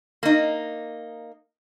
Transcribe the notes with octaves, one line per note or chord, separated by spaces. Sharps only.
A#3 D#4